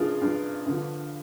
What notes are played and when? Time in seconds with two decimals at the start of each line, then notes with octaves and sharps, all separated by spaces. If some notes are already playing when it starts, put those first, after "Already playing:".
Already playing: G2 F3 F4 G#4 A#4
0.21 G2 F3
0.66 G2 D3 F3